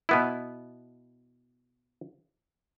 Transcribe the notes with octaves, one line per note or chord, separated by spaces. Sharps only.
B2 B3 E4